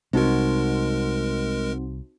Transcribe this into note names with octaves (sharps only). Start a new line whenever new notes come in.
C2 G#3 C4 D#4 F#4 A#4